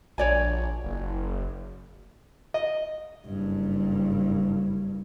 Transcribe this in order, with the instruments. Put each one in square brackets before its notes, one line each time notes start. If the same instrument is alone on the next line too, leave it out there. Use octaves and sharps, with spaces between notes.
[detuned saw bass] A#1 [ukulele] C#5 D5 G#5
[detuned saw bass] F#1
[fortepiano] D#5
[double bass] F#1 G2